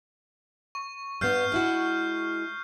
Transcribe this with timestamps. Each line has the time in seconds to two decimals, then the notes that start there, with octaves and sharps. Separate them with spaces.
0.75 C#6
1.21 G2 B3 F6 G6 C7
1.52 G#3 E4 F#4